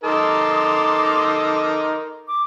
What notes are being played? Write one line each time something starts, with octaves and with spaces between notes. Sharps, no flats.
D#4 A4 A#4 C6 D6 D#6
D6